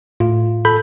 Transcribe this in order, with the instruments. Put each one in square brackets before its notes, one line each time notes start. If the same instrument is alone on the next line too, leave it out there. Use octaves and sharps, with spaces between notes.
[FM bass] A2 [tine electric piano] F4
[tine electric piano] A4 B5 G6